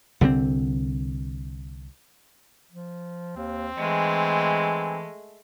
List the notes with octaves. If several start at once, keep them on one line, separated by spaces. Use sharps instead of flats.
C2 D3 D#3 C4
F3
D#2 C4
E3 G#3 A3